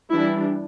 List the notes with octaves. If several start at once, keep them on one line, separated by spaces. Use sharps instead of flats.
E3 G3 D4 E4